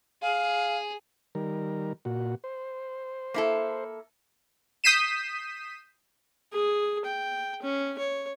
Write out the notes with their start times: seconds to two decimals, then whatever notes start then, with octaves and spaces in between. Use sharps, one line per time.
0.22 G#4 F5
1.35 D#3 G3 A#4
2.05 A#2 F#4
2.44 C5
3.34 A#3 E4 A4
4.84 D#6 G6 B6 C7 D#7 E7
6.53 G#4
7.05 G5
7.62 C#4
7.98 C#5